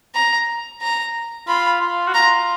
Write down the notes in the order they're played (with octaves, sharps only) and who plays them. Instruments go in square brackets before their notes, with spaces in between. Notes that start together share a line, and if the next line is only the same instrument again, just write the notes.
[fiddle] A#5
A#5
[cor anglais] F4 [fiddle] B5
[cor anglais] F4
F#4
[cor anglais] F4 [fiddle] A#5